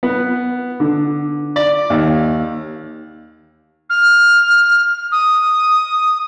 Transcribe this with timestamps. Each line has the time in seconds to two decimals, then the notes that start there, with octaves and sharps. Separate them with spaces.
0.03 B3
0.80 D3
1.56 D5
1.90 D#2
3.90 F6
5.12 D#6